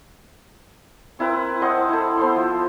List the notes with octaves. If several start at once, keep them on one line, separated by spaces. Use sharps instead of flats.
C4 E4 A#4 B4
C5 D#5 F#5 A5
E4 A4
B3 C5 C6
F3